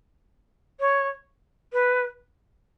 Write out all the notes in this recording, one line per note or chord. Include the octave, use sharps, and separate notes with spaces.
C#5
B4